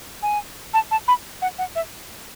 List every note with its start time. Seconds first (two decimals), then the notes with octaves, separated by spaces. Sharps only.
0.23 G#5
0.74 A5
0.91 A5
1.08 B5
1.42 F#5
1.58 F#5
1.76 E5